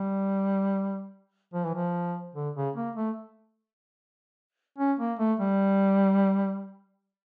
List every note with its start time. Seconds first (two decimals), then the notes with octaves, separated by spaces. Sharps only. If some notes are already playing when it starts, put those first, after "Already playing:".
Already playing: G3
1.53 F3
1.65 E3
1.75 F3
2.35 D3
2.56 C#3
2.76 A#3
2.96 A3
4.78 C#4
4.99 A#3
5.19 A3
5.40 G3